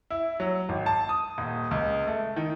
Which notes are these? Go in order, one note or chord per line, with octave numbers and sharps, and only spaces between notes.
E4
F#3
G#1
A5
D#6
D#1
C#2
A3
D#3